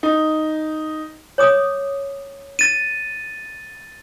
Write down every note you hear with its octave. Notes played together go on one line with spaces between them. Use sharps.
D#4
C#5 D6 D#6
A6 D#7